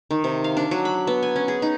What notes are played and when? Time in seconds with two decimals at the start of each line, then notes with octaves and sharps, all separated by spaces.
0.11 D#3
0.24 C3
0.44 F5
0.57 D4
0.71 F#3
0.85 B5
1.07 B3
1.23 G#5
1.36 C#4
1.48 G#4
1.62 D#4